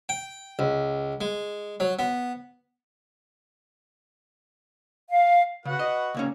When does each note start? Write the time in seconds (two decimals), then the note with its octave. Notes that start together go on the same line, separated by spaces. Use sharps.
0.09 G5
0.59 C#2
1.21 G#3
1.80 F#3
1.99 B3
5.09 F5
5.65 C#3 F#4 B4 F#5
5.79 D#5
6.15 C#2 A#3 C#4